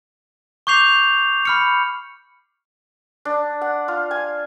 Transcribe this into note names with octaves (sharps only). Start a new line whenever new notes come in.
C#6 D6 G6 C7 F7
B5 F6 C#7
D4
F#5
F4
G#5